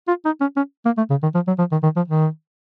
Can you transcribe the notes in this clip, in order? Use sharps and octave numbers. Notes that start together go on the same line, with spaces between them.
F4
D#4
C#4
C#4
A#3
A3
C#3
D#3
F3
F#3
F3
D#3
D#3
F3
D#3